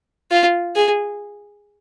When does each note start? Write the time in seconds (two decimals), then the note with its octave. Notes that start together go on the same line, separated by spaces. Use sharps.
0.31 F4
0.76 G#4